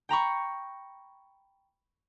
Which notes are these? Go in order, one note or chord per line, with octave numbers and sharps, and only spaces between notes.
G5 A#5 B5 C#6